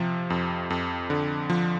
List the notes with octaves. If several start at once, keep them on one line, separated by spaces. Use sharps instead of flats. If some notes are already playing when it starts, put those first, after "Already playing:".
Already playing: C3 F3
F2
F2
D3
F3